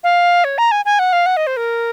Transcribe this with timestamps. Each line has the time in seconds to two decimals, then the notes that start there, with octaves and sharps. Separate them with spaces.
0.04 F5
0.44 C#5
0.58 A#5
0.71 G#5
0.85 G#5
0.99 F#5
1.13 F5
1.26 F#5
1.37 D#5
1.47 C5
1.57 A#4